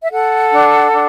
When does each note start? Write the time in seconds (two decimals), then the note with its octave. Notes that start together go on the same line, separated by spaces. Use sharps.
0.01 E5
0.11 A4 F#5
0.51 D4
0.91 D4